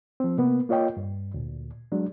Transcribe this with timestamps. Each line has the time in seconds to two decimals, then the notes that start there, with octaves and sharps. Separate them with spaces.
0.20 F3 C4
0.38 C3 A#3 B3
0.69 A#3 F4 C#5 D#5 G5
0.97 G2
1.34 D2 A#2
1.92 F#3 G#3 D4